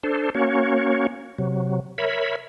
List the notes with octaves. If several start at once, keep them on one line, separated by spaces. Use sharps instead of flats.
D4 A4 C5
A#3 C#4 F#4 C#5
C3 F#3
A#4 C#5 E5 B5